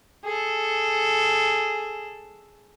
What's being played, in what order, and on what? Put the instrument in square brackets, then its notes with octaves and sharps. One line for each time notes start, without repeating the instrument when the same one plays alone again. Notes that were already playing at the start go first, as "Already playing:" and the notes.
[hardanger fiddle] G#4 A4